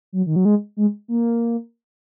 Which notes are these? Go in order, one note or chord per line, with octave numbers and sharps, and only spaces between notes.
F#3
D#3
F#3
G#3
G#3
A#3